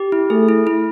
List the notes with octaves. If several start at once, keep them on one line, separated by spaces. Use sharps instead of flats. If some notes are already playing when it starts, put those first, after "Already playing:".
Already playing: G4
E4
A3 G#4
E4
E4